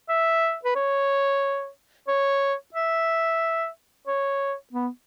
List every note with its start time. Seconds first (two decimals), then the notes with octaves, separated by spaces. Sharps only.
0.09 E5
0.65 B4
0.75 C#5
2.08 C#5
2.74 E5
4.07 C#5
4.73 B3